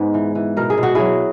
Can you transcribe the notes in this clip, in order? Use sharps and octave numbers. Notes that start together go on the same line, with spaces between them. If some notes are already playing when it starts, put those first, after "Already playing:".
Already playing: G#2 G#3 B3
E3
E3
B2 A#4
G#4
B2
F#4
F#3 E4 G#4